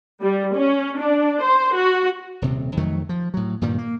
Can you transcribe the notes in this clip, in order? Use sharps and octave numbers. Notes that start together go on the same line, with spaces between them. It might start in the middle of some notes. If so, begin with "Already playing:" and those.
G3
C#4
D4
C5
F#4
D#1 C3
F2 D#3 F#3 A3
F3
A2 F#3
G2 A#2 D#3 G3
A#3